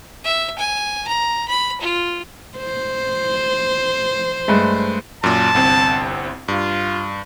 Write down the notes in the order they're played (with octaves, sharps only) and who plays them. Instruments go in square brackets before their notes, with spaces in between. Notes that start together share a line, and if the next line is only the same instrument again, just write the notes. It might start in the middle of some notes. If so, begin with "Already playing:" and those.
[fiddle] E5
G#5
A#5
B5
F4
[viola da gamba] C5
[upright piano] G2 G#3 A3
[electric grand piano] F#2 A#2 [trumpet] A5
[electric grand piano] G1 C2 C4
[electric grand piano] G2 [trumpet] F4